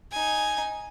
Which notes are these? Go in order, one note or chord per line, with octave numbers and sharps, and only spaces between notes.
D#4 G#5